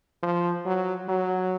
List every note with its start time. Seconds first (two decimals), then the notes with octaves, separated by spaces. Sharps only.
0.23 F3
0.66 F#3
1.09 F#3